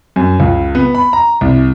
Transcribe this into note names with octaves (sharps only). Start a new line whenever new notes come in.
F#2
C#2
B3
B5
A#5
C2